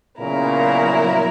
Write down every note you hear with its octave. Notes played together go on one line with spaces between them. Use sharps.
A#2 C#3 F#3 B3 E4 A#4